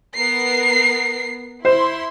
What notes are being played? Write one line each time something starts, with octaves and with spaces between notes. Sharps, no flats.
B3 A#4 C7
E4 C5 C6